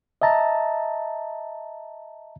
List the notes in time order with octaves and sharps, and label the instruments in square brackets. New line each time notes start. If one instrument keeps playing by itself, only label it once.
[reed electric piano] D#5 E5 A5 A#5